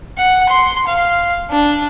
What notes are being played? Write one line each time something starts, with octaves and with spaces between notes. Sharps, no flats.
F#5
C6
F5
D4